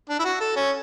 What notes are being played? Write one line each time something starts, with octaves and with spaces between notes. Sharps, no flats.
D4
E4
F#4
A4
C#4